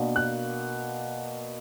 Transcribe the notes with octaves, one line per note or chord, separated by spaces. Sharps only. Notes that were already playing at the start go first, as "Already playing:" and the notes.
Already playing: B2 A#3 D4
F#6